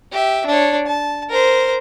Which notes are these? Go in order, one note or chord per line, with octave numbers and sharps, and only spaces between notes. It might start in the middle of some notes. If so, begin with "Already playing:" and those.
G4 E5
D4 C#5
A5
A#4 C5